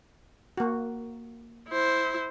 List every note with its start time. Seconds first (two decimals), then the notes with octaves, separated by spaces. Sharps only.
0.57 A#3 F#4
1.69 E4 C5